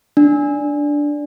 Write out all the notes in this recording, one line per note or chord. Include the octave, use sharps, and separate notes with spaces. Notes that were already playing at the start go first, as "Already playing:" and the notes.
D4